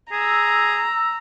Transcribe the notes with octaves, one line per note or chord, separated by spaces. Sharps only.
G#4 A#5 E6